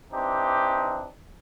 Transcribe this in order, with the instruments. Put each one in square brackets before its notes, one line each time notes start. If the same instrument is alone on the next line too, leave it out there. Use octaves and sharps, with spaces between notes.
[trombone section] E3 C4 D4 D#4 G4